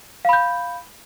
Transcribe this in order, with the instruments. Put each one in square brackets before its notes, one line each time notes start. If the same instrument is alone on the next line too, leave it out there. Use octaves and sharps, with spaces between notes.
[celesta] F5
B5
G6